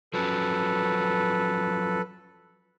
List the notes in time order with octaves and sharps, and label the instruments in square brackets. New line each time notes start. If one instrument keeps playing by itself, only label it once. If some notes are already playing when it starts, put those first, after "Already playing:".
[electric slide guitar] F3 F#3 C#4 [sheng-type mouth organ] A4 B4